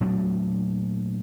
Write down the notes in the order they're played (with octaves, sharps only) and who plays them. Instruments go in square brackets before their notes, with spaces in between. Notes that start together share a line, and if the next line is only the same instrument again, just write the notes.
[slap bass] A#2 F#3 A3 D4